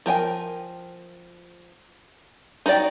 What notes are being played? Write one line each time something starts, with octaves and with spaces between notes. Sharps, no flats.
F3 A#4 G5 G#5
D#4 F#4 A#4 D5 G5